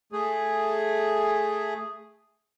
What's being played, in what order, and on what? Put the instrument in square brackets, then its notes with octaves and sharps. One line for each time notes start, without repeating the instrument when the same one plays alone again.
[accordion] A3 G#4